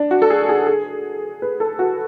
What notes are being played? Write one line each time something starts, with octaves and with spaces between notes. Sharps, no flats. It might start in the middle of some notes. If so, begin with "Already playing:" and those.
Already playing: D4
F#4
A4
G#4
G#4
G#4
B4
A4
F#4